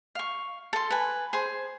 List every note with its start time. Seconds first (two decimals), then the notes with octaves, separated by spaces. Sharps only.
0.15 F5 C#6
0.73 A4 C6
0.90 B4 G#5
1.33 G#4 C5